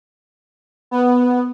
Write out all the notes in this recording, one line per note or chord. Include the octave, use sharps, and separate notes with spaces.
B3